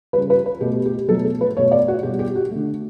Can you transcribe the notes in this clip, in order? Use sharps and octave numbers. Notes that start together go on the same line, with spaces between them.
C#3 G3 B4
B4
B4
B2 A3 G4
G4
B2 F#3 A3 A4
A4
B4
B2 A3 C#5
D5
F#4
B2 G3 G4
G4
F#4
D3 A3